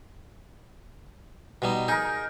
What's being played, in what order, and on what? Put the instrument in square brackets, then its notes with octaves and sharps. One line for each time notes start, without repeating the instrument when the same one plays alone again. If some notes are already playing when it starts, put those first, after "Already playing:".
[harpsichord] B2 G3 D#4
[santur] D#4 A#4 [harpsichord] G#4